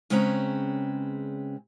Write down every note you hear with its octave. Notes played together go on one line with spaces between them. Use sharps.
C#3 G#3 C4 C#4 B4 A#5